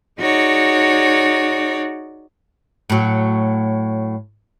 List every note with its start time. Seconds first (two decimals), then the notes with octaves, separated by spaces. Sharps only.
0.20 D#4 F#4 G#4 C#5 D5
2.90 A2 F#3